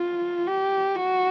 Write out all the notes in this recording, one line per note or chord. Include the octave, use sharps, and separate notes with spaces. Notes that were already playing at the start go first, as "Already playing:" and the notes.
Already playing: F4
G4
F#4